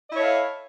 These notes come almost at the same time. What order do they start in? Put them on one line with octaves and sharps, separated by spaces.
D#5 E4 C#5 A4 F5